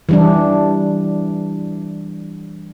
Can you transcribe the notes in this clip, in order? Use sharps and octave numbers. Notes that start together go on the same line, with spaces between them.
E3 G3 D4